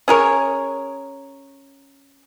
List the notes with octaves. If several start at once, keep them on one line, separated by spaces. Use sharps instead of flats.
C#4 G#4 A#4 C#5